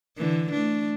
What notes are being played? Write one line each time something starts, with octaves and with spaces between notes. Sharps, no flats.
D3 E3
A3 D4